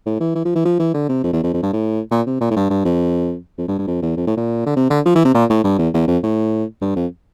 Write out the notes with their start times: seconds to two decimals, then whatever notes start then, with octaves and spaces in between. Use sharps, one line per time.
0.06 A2
0.20 E3
0.35 E3
0.45 F3
0.55 E3
0.65 F3
0.79 E3
0.94 D3
1.09 C3
1.24 F2
1.33 E2
1.43 F2
1.54 F2
1.63 G2
1.73 A2
2.11 A#2
2.26 C3
2.41 A#2
2.51 A2
2.56 G2
2.70 G2
2.85 F2
3.58 F2
3.68 G2
3.79 G2
3.87 F2
4.02 E2
4.17 F2
4.27 A2
4.37 A#2
4.66 D3
4.76 C3
4.90 D3
5.05 F3
5.15 E3
5.25 C3
5.34 A#2
5.50 A2
5.64 G2
5.78 E2
5.94 E2
6.08 F2
6.23 A2
6.82 G2
6.96 F2